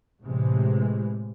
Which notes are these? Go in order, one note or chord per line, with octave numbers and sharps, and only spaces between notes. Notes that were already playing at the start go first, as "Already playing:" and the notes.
A2 C3 E3 G#3